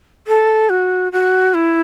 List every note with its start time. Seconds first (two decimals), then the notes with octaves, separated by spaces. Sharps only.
0.27 A4
0.69 F#4
1.12 F#4
1.54 E4